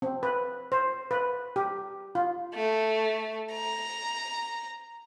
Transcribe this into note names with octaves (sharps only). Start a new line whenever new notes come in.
C4
B4
C5
B4
G4
F4
A3
A#5